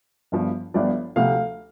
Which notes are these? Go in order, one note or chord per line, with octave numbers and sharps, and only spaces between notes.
G1 G2 F3
G1 G2 F3 D5
D2 C3 F3 A3 F5